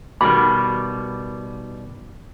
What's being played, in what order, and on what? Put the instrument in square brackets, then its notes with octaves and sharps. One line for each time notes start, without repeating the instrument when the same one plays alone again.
[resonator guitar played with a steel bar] B2 D#3 G3 [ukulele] A#4 B5 [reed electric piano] D6